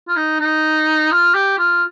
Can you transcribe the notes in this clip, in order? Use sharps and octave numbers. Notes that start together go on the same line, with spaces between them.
F4
D#4
D#4
F4
G4
F4